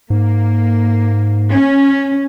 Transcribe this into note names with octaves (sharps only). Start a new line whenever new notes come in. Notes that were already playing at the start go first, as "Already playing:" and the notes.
G#2 A#3
C#4